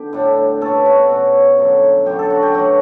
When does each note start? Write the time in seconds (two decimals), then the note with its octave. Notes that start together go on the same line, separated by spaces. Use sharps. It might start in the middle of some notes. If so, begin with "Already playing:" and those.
Already playing: D3 B3 G4
0.13 A2 G3 D4
0.61 B2 A3 C#4 A4
0.86 F#4
1.10 B2 A3 C#4
1.58 F#2 D3 G3
2.06 F#2 D3 G3 G4
2.19 A4
2.30 F#4
2.42 G4
2.54 B2 F#3 A3 F#4